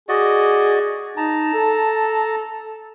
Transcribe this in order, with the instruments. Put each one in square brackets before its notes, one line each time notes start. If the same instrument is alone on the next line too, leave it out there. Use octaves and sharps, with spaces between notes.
[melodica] F#4 D5 D#5 [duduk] G#4
[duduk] D#4 [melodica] A5 A#5
[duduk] A4